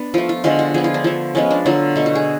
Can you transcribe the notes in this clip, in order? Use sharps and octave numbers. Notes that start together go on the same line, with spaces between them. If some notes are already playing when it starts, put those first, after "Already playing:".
Already playing: B3 D4
F3 A3 F4
F4
D3 F3 G#3 F4
F#4
F3 B3 G#4
F4
D4
F3 A3
F3 G#3 B3 C#4
D4
D3 F#3 A3 F4
B2 A3
F#4
G#4